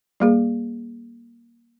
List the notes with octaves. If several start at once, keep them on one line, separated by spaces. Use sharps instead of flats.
G3 A#3 G#4